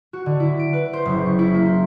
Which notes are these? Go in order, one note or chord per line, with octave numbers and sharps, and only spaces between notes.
F#4
D3
E4
D7
B4
C5
F#1
C#6
E4
A#3
C5